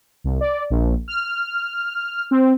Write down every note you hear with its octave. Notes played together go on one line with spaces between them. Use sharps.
C2
D5
A#1
F6
C4